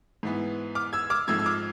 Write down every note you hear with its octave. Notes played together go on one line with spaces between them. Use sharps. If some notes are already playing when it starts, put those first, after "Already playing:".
G#2 E3 B3
D6 F6
E6 G#6
D6 F6
G#2 F3 A3 C4 E6 G#6
E6
D6 F6